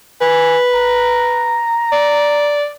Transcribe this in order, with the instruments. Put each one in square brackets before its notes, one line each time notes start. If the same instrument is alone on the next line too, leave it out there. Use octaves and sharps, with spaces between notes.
[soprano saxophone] B4 [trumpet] G#5
[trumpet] A#5
[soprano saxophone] D5